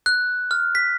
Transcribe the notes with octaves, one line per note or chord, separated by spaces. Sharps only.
F#6
F6
B6